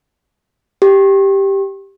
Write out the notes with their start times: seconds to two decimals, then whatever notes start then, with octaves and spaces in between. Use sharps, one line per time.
0.82 G4